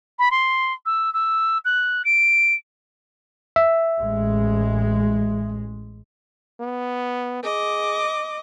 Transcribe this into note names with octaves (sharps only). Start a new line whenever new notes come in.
B5
C6
E6
E6
F#6
D7
E5
A1 G#3
B3
G#4 D#5 D6